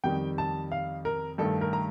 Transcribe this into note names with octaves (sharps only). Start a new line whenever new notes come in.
F2 D#3 G3 G5
A5
F5
A#4
G2 D#3 A3 A4
A#4
A#5